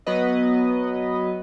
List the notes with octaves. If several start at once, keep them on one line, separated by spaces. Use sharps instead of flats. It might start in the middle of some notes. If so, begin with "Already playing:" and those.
F#3 B3 B4 D#5